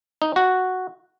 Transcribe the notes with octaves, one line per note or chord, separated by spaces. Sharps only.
D#4
F#4